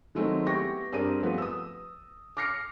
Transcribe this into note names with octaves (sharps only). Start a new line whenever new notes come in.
D#3 F#3 G#3 A3 C4 D#4
B3 E4 G4 G5 C#6 A#6
G2 C4 G#4 A#4 D5 D#7
F3 G3 A3 B3 B4
D#6 E6
D6 F6 A#6 C7 C#7